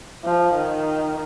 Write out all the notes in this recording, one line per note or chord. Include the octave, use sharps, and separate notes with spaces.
F3
D#3